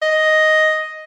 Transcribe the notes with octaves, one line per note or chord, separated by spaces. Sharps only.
D#5